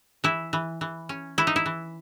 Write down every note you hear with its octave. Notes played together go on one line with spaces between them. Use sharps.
E3 E4
E3
E3
C#4
E3 E4
D#4
E4
E3